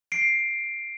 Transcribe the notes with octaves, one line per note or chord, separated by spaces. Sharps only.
C7 D7